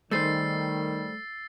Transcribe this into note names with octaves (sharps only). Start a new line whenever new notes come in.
D#3 G3 A3 G#4 C5 E6 A6 C7